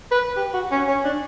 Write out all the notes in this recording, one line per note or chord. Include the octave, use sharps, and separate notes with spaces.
B4
G4
F#4
C#4
C#4
D4